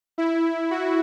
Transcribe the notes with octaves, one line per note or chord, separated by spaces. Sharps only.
E4
F#4